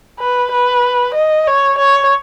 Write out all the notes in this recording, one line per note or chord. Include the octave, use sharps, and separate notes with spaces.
B4
B4
D#5
C#5
C#5